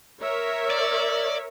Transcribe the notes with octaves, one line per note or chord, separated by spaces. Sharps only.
A#4 C#5 E5
D5